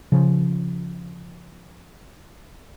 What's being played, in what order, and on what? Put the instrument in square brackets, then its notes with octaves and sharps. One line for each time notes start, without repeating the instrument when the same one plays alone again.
[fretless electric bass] C#3 F3